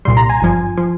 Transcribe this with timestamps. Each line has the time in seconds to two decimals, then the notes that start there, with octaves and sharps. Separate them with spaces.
0.05 C2 A#2 G3 C6
0.17 A#5
0.30 G#5
0.40 G#1 G2 F3 G#5
0.77 F3